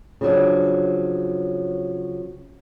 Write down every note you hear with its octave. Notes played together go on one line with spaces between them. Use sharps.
C#3 F3 F#3 D4